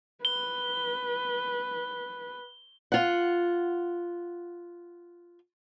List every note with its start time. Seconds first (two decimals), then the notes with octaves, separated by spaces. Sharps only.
0.25 B4 G7
2.92 F4 F#5